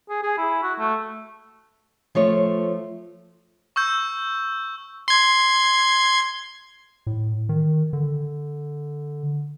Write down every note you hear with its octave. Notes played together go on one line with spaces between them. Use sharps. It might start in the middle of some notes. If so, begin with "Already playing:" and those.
G#4
G#4
E4
F#4
A3
F3 A3 C#5
C#6 E6 G6
C6 G#6
A2
D#3
D3